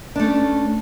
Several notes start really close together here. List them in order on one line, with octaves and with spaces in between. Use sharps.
D4 A3 C#4